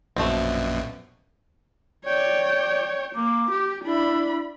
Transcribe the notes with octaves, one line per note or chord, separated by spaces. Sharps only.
A#1 F#2 B2 A3 C4
C#5 D5 G5
A#3 D6
G4
D4 E4 B5